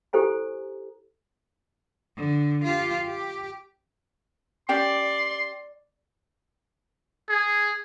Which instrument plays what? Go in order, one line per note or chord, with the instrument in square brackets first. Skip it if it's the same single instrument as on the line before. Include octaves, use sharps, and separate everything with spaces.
[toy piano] E4 G4 A4 C5 G#5 A#5
[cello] D3
F4 G4
G4
[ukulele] C#4 G4 G5 [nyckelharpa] D5 [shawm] C6
[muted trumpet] G#4